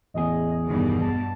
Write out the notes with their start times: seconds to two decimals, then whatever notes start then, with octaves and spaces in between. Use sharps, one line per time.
0.14 A1 E2 G#4 D#5
0.68 G2 B2 D#3 G3
1.01 A5